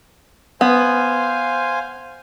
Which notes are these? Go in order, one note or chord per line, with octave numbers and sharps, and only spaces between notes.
B3 C5 F5 G#5